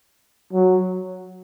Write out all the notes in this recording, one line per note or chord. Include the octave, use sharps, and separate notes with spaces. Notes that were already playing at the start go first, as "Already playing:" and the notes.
F#3